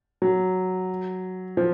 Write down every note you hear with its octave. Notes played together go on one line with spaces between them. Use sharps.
F#3
F3